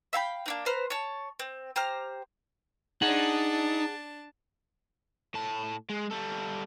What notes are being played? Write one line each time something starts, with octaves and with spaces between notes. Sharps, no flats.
E5 F5 G5 B5
A#3 D4 D#4
B4 C5 A#5 F6
C#5 A5
C4
G4 C5 A#5 F6
D4 D#4 G#4 F#5 A5
A2 A5
G#3
G3 A4